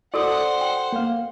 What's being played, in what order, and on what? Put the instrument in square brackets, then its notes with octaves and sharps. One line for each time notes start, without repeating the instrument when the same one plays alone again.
[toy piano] F#4 A4 D#6 [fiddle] C5 F#5 [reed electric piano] D5
[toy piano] G5
[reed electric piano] A#3 F5